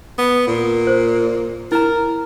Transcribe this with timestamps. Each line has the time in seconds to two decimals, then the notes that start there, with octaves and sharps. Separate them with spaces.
0.19 B3
0.47 A#2
0.87 C5
1.72 E4 A#4 A#5